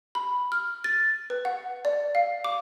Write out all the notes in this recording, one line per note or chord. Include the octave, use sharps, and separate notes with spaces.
B5
F6
A6
B4
F#5
D5
F5
D6